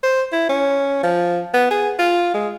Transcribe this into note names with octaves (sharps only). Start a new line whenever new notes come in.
C5
E4
C#4
F3
B3
G#4
F4
G#3